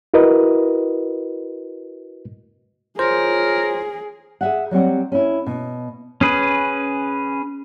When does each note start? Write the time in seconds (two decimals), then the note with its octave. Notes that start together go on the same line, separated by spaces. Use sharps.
0.14 E4 F#4 A#4 B4 D#5
2.99 F4 G#4 A#4 C5 C#5
4.41 G#4 E5 F#5
4.71 F#3 G3 C4 F#5
5.12 C#4 E4
5.46 B2
6.21 C#4 G#4 B4